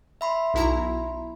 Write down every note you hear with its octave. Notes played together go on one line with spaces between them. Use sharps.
E5 B5 C6
B1 E4 A#5